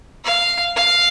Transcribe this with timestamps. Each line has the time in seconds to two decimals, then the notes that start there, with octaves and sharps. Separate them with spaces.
0.24 F5
0.76 F5